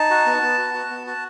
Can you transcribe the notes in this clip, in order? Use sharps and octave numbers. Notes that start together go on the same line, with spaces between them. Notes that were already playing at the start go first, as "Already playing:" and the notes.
Already playing: D#4 A5
F#4
B3
B3
F#4
F#4
B3
F#4 A5